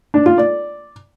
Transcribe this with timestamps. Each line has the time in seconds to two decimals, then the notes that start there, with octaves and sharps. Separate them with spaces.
0.14 D4
0.26 F4
0.38 D5